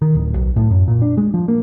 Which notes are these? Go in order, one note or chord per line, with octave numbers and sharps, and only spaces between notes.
D#3
D1
B1
A2
F#2
A#2
D4
G#3
F3
A#3